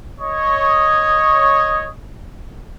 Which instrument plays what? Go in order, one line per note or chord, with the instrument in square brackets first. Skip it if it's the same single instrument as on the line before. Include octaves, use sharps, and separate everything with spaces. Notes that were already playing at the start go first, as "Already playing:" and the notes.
[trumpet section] C#5 D#5